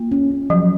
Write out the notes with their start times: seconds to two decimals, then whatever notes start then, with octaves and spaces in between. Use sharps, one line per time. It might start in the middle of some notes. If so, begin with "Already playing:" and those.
Already playing: A#3 F4
0.12 C#4
0.31 C#4
0.50 F3 F#3